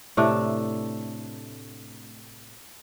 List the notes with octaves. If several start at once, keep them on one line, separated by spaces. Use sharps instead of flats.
A2 C3 A3 D4